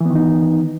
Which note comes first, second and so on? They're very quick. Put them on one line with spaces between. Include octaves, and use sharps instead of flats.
E3 B3 D#3 D#4